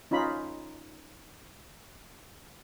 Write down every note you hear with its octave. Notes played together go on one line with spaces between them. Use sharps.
C#4 D#4 F4 B5